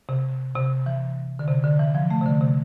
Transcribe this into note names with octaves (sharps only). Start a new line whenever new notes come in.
C3
C3
E3
D3
C3
D3
E3
F3
A3
C3
D3
C3